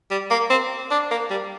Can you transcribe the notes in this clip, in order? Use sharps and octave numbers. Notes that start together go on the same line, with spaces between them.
G3
A#3
C4
D4
A#3
G3